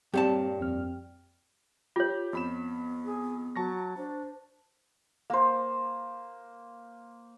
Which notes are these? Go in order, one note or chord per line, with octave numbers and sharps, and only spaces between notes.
G2 A#2 G3 C4 G4 C#5 A5
F2 C4 F6
F4 G4 C#5
F2 B3 B5 E7
G#4
F#3 A5 C#6 A#6
D4 C5
A#3 C5